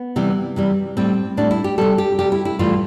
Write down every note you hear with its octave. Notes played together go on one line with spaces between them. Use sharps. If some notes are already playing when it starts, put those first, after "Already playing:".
Already playing: B3
C3 E3 G3
C3 E3 G3
A2 G3 C4
A2 G3 D4
E4
G4
C3 G3 A4
G4
C3 G3 G4
E4
E4
A2 E3 G3 F4